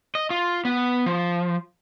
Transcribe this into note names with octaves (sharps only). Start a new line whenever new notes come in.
D#5
F4
B3
F3